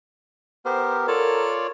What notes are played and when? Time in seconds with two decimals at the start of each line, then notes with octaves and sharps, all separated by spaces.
0.65 B3 G4 A#4 C5
1.08 F4 A4 A#4 C#5 D5